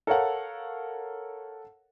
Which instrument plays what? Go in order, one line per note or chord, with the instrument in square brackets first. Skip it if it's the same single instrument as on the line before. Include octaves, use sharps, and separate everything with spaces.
[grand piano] A4 A#4 C#5 F5 F#5